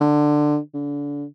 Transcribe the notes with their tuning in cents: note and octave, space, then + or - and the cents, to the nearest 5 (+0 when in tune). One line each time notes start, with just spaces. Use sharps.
D3 +15
D3 -30